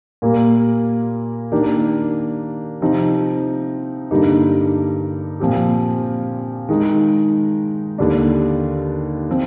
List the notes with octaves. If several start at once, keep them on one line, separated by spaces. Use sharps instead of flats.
A#2 G3 A#3
D#3 A#3 D4 G4
C3 F3 C4 D#4
G2 D3 G3 A#3 D#4
A#2 F3 C4 G4
D#3 G#3 D#4
D#2 D3 G3 D4
F3 C4